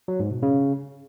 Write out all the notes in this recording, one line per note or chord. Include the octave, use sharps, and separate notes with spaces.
F#3
G#2
B2
C#3